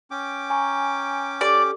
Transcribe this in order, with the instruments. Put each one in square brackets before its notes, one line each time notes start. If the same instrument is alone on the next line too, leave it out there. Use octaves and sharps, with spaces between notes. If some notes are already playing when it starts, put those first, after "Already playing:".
[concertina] C#4 G5 D6
[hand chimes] G#5 A#5 C#6
[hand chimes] G4 A4 [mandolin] D5